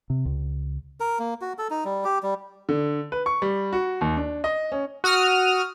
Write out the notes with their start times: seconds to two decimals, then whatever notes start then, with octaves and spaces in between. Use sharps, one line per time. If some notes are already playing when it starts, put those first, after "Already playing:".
0.10 C3
0.25 C#2
1.00 A#4
1.19 A#3
1.41 F#4
1.59 A4
1.70 D#4
1.85 G3
2.05 G4
2.23 G3
2.69 D3
3.12 B4
3.26 C#6
3.42 G3
3.73 F#4
4.01 D#2
4.17 D4
4.44 D#5
4.72 C#4
5.04 F#4 D#6 F6